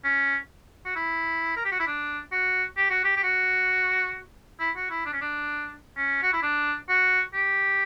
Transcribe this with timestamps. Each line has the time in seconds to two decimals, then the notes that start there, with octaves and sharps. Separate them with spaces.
0.04 C#4
0.85 F#4
0.96 E4
1.56 A#4
1.65 G4
1.72 F#4
1.80 E4
1.87 D4
2.32 F#4
2.77 G4
2.90 F#4
3.04 G4
3.16 G4
3.23 F#4
4.60 E4
4.76 F#4
4.90 E4
5.06 D4
5.13 C#4
5.21 D4
5.97 C#4
6.22 F#4
6.33 E4
6.42 D4
6.89 F#4
7.34 G4